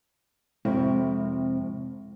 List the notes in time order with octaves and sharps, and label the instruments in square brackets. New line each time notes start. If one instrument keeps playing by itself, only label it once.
[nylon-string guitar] F2 C3 E4 [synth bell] G#3 C4